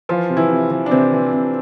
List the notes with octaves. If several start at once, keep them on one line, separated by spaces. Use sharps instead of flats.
E3 F3 F4
C3
E3 E4
C3
E3
D4
C3 E3 C4
E3
C3